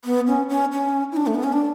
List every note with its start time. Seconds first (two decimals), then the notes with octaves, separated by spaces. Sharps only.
0.05 B3
0.27 C#4
0.49 C#4
0.72 C#4
1.12 E4
1.16 D4
1.27 A3
1.35 B3
1.43 C#4
1.52 D4